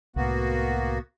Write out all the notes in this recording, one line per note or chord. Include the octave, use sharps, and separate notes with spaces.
C2 A2 A#3 B3 F#4